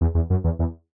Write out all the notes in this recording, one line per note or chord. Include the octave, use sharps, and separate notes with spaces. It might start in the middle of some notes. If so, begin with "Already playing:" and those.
E2
E2
F#2
E2
E2